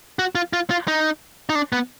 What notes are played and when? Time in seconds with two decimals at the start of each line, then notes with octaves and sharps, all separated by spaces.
0.19 F#4
0.35 F4
0.53 F4
0.70 F4
0.88 D#4
1.49 D#4
1.55 D4
1.73 B3